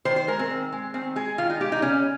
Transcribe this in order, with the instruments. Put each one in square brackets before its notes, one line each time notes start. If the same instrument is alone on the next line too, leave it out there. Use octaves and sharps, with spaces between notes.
[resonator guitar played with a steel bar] D#3 C5
C5
G#3 A#4
C4
D#3
G#3
D#3 C4
G#3 G#4
D#3 F4
D#4
G#3 G4
D#4
C#3 C#4